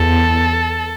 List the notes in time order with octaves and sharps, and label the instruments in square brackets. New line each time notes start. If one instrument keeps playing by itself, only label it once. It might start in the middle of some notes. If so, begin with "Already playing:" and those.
Already playing: [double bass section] E2 [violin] A4